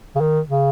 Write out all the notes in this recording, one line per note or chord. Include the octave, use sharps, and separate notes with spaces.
C#3
D#3
C#3